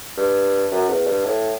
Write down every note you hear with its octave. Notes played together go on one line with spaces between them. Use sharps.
G2
F#2
E2
G2
A2